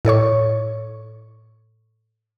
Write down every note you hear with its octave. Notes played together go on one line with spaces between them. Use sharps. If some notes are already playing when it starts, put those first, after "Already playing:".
A2 A4 C#5 C#6